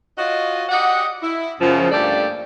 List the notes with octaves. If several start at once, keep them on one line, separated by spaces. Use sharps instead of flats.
F4 F#4 C#5 D#5
F#4 G4 D5 D#5 F#5
E4
F#2 C#3 F3
G2 A3 A#3 G4 A4 D5